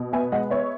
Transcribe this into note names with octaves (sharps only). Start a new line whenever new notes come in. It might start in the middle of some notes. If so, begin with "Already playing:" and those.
Already playing: B2
B3 E5 G#5
G#3 D#5 F#5
B3 C#5 E5